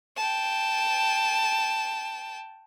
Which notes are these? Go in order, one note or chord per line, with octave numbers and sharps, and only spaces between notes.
G5 A5